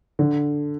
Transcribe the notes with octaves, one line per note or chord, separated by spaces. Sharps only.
D3